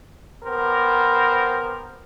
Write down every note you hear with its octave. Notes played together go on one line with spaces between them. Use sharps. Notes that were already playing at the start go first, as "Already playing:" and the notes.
B3 G4 A#4 C5